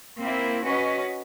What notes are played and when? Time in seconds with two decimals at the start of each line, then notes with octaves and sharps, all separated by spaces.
0.19 A#3 C4 E4
0.63 C#4 F#4 B4 D#5